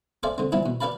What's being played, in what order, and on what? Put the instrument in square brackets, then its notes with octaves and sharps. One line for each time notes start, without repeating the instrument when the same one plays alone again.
[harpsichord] G#4 A4 C5 D5 E5 F5
D3 C4
E3 F3 G3 B3 E4
B2
G4 B4 D5 F5 A5 B5